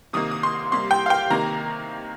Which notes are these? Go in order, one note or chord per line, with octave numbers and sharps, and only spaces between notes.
C3 D#3 A#3 D#6
D#6
C6
C3 G3 A#3 C6
G5
F5
G5
C3 D#3 A#3 A#5